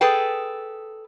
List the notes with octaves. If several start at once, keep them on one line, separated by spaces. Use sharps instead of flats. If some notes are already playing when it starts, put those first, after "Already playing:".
G#4 A4 B4 G5